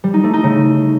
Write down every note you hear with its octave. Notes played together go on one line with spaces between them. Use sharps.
G3
D#4
A3
D#4
C#3